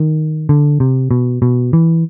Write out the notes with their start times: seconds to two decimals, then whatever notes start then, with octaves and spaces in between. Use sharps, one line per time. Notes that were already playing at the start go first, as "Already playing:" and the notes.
Already playing: D#3
0.49 D3
0.80 C3
1.11 B2
1.42 B2
1.73 E3